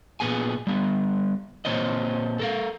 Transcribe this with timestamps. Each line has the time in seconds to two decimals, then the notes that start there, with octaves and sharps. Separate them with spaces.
0.20 A#2 B3 G#4 G#5
0.67 G3 B3
1.65 A#2 D#3 C4 C5 C#5 D#5
2.39 A4 A#4 F5